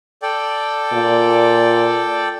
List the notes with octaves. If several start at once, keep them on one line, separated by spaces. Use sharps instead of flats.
A4 D5 G5
A#2